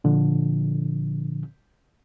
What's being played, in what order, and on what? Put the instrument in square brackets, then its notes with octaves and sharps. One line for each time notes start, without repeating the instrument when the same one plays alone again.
[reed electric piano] A#2 D3 F3